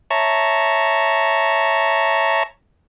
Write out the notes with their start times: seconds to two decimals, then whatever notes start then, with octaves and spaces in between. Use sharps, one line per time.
0.10 C#5 E5 A5 A#5 C#6